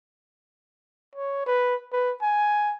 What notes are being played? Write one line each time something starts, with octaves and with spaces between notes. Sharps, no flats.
C#5
B4
B4
G#5